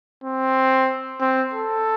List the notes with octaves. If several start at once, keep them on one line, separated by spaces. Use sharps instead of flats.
C4
C4
A4